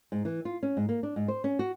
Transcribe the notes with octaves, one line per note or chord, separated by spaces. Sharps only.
G#2
E3
F4
C#4
G#2
A#3
D4
G#2
C5
C#4
F#4